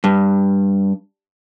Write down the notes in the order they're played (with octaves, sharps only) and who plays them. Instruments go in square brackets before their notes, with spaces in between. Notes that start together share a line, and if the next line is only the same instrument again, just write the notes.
[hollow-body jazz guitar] G2